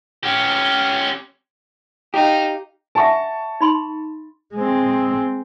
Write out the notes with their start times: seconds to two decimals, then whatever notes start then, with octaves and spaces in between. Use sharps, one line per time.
0.23 C#4 G4
2.14 D#4 G4 F5
2.95 E5 F#5 G#5 A5 C#6
3.61 D#4 B5 C6
4.55 G#3 C4